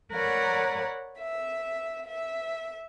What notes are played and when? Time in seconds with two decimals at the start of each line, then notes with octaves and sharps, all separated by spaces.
0.12 A#4 B4 C#5 D5 F#5
1.19 E5
2.05 E5